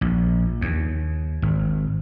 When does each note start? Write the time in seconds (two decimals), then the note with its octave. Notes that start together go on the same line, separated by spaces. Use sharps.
0.01 A#1
0.61 D#2
1.42 G#1